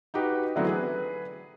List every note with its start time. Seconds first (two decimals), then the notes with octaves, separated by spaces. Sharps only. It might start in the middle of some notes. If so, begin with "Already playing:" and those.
0.14 D#4 F#4 G4 B4
0.56 D3 E3 F#3 A3 B3 C4
0.67 G#4 B4